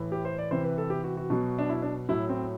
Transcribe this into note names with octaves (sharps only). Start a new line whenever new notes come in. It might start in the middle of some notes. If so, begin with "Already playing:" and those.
Already playing: A2 E3
G4
C5
D5
C3 E3 C5
B4
A4
G4
F#4
F#4
B2 F#3
D4
E4
D4
A2 F#3 E4
C4